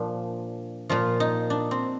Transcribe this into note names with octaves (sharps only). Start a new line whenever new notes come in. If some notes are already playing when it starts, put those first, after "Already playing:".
Already playing: A#2 F3 D4
A#2 F3 F4
D#4
D4
C4